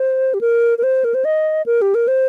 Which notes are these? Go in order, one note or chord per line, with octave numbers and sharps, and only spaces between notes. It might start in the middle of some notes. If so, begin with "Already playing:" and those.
Already playing: C5
G4
A#4
A#4
C5
A#4
C5
D#5
A#4
G4
A#4
C5